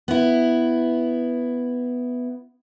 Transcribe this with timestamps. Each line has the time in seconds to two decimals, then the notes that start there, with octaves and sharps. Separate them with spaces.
0.08 B3 E4